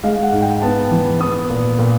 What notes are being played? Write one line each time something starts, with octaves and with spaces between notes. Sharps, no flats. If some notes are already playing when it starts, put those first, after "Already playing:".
G#3 F5
F#5
G#2
G5
B3 A5
E3
B3 D#6
A#2
A#2